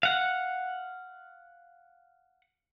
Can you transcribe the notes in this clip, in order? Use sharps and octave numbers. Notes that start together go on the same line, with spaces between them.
F5 F#5